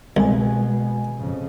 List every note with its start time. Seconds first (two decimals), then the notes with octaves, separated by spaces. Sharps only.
0.17 C2 B2 G#3 G#5
1.17 F2 C#3